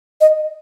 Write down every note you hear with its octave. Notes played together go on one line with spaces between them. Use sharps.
D#5